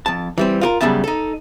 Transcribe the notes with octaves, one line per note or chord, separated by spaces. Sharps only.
F2 A5
E3 G3 C4
F4 G4 A#4
F#2 C#3 G3 B3 E5 A5
D#4 A4